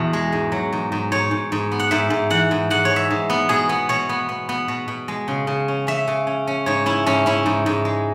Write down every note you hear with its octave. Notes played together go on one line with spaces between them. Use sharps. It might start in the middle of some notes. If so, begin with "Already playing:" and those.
Already playing: E2 B2 E4
G#3
G#2
F#3
G#2
G#2
G#2 C#5
G#2
G#2
B3
F#5
G#2 E5
G#2
E3 F#5
G#2
G#2 F#5
C#5
G#3
E5
G#2
B3
B2 G#4
B3
B2 C#5
B3
B3
B3
B2
B2
G#3
C#3
C#3
C#4
C#4 E5
C#3
C#4
C#4
G#2 C#5
C#4 E4
G#2 C#4
C#4 E4
G#2
G#2
G#3